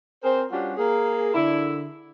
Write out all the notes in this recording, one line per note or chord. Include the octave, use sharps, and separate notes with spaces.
C4 G#4 A#4 C5
G3 C#4 D4 F4 F#4
A#3 G#4
D3 E4